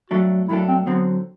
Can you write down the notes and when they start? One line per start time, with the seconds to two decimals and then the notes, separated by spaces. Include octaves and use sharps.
0.10 G2 F#3 A3 D4 F#4 A4
0.48 G2 F#3 A3 D4 E4 A4
0.68 C4
0.86 D3 F#3 B3 C4